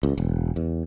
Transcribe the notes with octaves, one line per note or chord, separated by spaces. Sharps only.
C#2
E1
E2